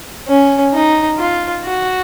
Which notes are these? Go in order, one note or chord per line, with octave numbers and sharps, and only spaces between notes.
C#4
D#4
F4
F#4